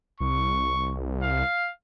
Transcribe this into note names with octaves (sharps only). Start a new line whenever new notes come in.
C2 C#6
F5